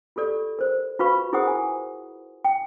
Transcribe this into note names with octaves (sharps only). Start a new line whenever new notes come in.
F4 G4 A4 D5
A#4 C5
F4 F#4 B4 F5 B5 C#6
E4 G#4 A#4 C5 F#5 D#6
G#5
G5